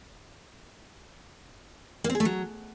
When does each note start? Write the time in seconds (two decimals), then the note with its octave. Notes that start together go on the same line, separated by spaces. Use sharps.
2.04 A#3
2.10 C4
2.15 G#4
2.20 A3
2.25 F#3